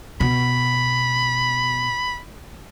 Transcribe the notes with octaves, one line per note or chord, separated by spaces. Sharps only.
B2 B5